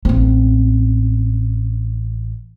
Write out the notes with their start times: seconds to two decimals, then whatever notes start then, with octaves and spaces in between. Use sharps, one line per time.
0.05 A1 C4